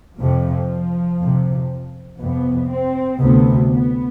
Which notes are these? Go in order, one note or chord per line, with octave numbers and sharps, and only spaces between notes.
F2 C3 F3
F2 C3
F2 C3 B3
C4
D2 C3 B3
B3